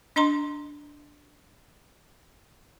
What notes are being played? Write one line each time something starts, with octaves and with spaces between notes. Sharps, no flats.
D4 D#5 A#5 C6